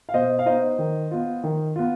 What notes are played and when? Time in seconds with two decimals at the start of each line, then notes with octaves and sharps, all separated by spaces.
0.09 F5
0.13 B2 C5 D#5
0.39 F5
0.46 B3 D#4 C5 D#5
0.79 D#3
1.11 B3 F4
1.44 D#3
1.76 B3 F4